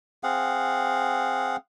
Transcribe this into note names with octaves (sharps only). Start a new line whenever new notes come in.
C4 G#4 F5 F#5